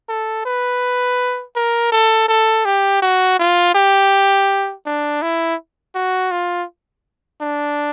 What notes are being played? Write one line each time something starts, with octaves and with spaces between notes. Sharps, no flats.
A4
B4
A#4
A4
A4
G4
F#4
F4
G4
D4
E4
F#4
F4
D4